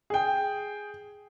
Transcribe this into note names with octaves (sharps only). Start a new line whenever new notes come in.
G#4 G5